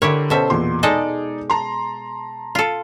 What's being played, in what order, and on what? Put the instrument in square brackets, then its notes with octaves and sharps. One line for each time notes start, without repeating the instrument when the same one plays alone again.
[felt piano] D3 A#4 [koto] E4 G4 C#5
[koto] B2 E5 [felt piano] C#4 A4 C5
[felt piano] E2 A#2 C6
[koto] G#3 A4 D#5 [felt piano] D#4 G#4 D5
[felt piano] A5 A#5 C6
[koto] F4 A4